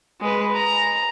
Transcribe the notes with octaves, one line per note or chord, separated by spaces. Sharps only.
G#3 B4
A#5